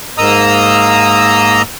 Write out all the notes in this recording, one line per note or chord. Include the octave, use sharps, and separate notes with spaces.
G#2 A#3 D#5 A#5 D#6 E6